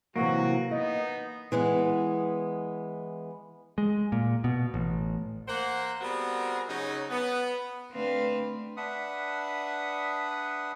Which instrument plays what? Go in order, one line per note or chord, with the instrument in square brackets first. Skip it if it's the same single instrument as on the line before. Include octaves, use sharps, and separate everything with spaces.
[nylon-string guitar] C3 E3 F#3 [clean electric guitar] A#3 [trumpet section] F#4
[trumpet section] B3 D#4 [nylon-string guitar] D#5
[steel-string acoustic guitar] E3 G#3 B3
[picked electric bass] G#3
A#2
B2
A1
[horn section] A#3 C5 F#5
G3 B3 C4 F#4 G#4 A#4
C#3 F#3 D#4
B3
[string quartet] D3 A3 C4 D4 B4 F5
[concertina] D4 B4 E5 F#5 D#6